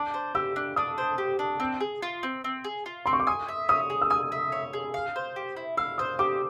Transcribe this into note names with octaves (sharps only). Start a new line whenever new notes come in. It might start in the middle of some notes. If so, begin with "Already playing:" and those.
Already playing: D4 D6
C5
G4 E6
D4
D4 D#6
C5
G4
D4
C4
G#4
F4
C4
C4
G#4
F4
C4 C6
C#6
D6
G#5 D#6
E5
C#5 D#6
G#4
E6
G#5 D#6
E5
C#5
G#4
F5
C5
G4
E4
F5 E6
C5 D#6
G4 D6